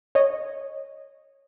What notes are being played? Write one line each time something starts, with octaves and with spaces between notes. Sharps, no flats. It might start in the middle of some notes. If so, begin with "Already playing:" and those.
C#5 D#5